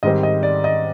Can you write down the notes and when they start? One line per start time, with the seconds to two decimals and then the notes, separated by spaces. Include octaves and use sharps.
0.03 G#2 D#3 G3 C4 D#5
0.23 D#5
0.43 D5
0.64 D#5